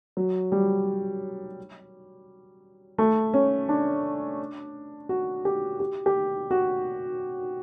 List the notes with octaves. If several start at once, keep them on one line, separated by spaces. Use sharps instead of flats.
F#3
G3
A3
C#4
D4
F#4
G4
G4
G4
F#4